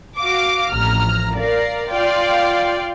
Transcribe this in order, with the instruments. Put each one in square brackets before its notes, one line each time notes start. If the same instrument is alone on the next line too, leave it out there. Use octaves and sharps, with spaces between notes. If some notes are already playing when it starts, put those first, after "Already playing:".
[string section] F#4 F5 D6
A1 F2 A#5 F6
A#4 D5 F5
F4 D5 F5 G5